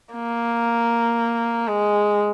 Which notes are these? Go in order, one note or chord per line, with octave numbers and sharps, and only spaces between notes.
A#3
G#3